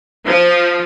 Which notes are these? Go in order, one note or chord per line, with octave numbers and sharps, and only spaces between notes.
F3